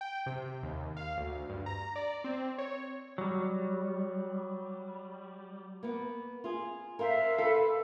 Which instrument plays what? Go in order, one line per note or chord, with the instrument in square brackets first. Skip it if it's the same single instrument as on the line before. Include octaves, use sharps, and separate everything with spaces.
[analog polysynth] G5
C3
D#2
F5
D2
G2
A#5
D5
C4
C#5
[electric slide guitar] F#3 G3
[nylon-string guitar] A#3 B3
F4 G#4
[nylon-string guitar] A#4 C5 [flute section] E5 F5
[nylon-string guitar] F4 B4 [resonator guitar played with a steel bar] A4